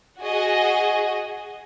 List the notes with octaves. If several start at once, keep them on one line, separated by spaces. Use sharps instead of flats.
F#4 G#4 D#5